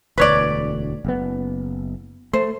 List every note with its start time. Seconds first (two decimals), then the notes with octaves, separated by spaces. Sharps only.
0.18 E1 D2 B4 C#5 D5
1.05 F#1 B3
2.33 A3 C5